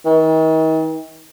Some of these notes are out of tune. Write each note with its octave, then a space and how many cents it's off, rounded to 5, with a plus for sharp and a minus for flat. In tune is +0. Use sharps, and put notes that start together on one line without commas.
D#3 +40